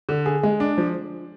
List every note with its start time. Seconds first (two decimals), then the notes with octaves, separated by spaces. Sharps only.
0.09 D3
0.26 G#4
0.43 G#3
0.60 D4
0.78 F3